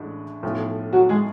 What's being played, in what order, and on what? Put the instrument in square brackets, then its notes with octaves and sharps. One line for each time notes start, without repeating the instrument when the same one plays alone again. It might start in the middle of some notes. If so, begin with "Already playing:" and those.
Already playing: [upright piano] A1 A2 G#3 D4
B1 A2 F3
[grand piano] F#3 F#4
G#3 G#4